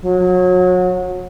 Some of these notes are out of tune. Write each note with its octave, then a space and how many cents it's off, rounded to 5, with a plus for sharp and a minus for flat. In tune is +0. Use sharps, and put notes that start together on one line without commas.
F#3 -30